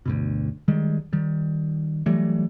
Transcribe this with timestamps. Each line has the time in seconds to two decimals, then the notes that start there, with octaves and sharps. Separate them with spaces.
0.06 D2 G2 B2
0.68 D#3 G3 G#3
1.13 D#3 G3
2.06 E3 F#3 G3 A3